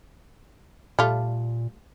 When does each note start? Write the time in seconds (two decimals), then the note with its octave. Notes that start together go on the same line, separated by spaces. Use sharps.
0.99 A#2 G3 A3 F4